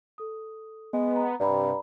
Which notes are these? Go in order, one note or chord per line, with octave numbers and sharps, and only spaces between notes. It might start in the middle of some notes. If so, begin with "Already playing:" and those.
A4 D#6
G#3 B3
A#5
G2 C3 D5 A#5 B5